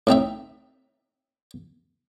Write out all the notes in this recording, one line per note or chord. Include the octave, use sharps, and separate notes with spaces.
A2 C4 D#4 E5